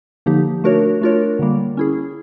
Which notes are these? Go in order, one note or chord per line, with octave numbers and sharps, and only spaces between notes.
D3 F3 A#3 D#4 G4
A3 D4 F#4 A#4 C#5
A3 D4 F4 A#4 C#5
D3 G3 A#3
C#4 E4 G#4